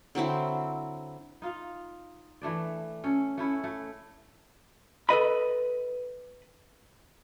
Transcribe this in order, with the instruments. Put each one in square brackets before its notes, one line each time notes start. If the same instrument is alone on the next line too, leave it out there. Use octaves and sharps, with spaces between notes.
[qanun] D3 F#3 C4 E4
[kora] D#4 F4 F5
E3 A3 D4 D5
C#4 A4
A3 C#4 E4
A3
[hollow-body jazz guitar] A4 B4 D#5 B5